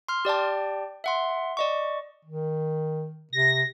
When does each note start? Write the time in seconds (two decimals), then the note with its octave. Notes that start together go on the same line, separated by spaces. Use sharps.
0.08 C6 F6
0.25 G4 D5 G5 A5
1.04 E5 F#5 C6
1.57 D5 D#5 C#6
2.25 D#3
3.33 C3 A#6